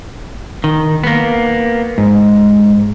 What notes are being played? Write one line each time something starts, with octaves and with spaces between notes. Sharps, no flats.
D#3
A#3 B3
G#2